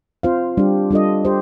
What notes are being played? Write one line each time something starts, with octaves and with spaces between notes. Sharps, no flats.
C4 F4 C5 F5
G3 D4 G4
G3 D4 F4 A4 D#5
G4 C5